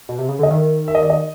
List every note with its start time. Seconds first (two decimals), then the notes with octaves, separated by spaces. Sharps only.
0.09 B2
0.18 C3
0.29 C#3
0.39 D3 D#5
0.50 D#3 E5
0.88 E5
0.95 D#5
1.02 D5
1.10 D#5